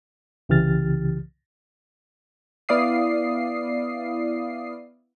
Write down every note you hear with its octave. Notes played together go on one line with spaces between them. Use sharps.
C2 C#3 E3 G4 F6 A6
B3 E4 D5 F5 D#6 C7